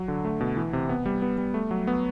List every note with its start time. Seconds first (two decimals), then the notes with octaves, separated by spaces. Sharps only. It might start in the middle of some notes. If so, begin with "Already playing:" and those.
Already playing: F#3
0.08 D3
0.25 A3
0.41 B2
0.57 E3
0.73 C3
0.89 B3
1.06 G3
1.22 B3
1.38 G3
1.54 A3
1.71 F#3
1.87 B3